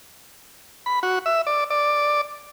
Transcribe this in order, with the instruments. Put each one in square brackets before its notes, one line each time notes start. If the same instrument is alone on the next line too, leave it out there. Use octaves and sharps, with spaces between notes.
[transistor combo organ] B5
F#4
E5
D5
D5